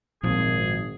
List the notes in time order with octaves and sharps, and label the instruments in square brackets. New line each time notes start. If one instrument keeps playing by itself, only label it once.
[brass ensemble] G#1 [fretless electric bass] A#2 F3 [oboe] G#4